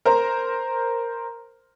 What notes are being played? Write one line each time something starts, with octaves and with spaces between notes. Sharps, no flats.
A#4 C5 A#5